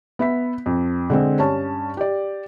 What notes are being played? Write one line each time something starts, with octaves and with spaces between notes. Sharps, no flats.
B3 E5 B6
F2
D3 G#3 C4
G2 C#4 A5
G4 D5